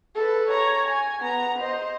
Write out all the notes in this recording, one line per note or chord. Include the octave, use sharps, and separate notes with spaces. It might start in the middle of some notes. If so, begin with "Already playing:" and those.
A4 B4
C#5 A#5
G#5
B3 A#5
C5 D#5